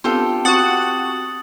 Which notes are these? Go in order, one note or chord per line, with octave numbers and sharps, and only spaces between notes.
B3 C4 D4 F4 G4 A4
C4 F#4 F#5 D#6 A6 F#7